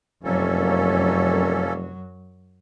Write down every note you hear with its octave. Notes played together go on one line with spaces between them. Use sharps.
F1 F#2 F#3 A#3 C#4 A4